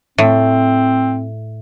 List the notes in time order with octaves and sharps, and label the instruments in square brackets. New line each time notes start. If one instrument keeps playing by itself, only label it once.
[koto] A2 [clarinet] C4